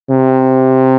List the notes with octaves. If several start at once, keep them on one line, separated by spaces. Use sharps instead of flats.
C3